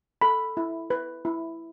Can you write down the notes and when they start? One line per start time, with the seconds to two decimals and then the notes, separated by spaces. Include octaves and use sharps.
0.22 A4 B5
0.57 E4
0.90 B4
1.25 E4